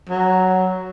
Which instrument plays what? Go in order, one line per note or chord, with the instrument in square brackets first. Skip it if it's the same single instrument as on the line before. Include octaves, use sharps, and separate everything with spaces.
[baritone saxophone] F#3